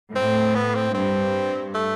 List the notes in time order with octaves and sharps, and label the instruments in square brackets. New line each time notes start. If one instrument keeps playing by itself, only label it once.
[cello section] A2 [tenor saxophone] C4
[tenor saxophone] B3
C4
[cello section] G2 [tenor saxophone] C4
[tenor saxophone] A3